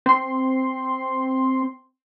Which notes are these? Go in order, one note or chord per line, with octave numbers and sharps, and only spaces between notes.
C4 C6